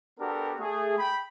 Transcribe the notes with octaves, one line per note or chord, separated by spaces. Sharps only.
B3 D4 F#4 G4 A4 A#4
A3 G#4
G5 B5